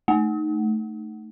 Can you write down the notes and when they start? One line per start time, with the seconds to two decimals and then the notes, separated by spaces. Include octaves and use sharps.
0.08 A3